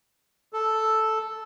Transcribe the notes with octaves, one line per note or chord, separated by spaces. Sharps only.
A4